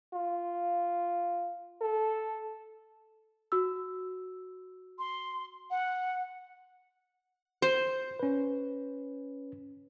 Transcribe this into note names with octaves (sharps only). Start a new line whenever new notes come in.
F4
A4
F#4 E6
C6
F#5
C5 C6
C#4 B4